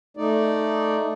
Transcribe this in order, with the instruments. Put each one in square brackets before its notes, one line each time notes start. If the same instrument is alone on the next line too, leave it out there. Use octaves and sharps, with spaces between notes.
[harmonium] A3 D#4 D5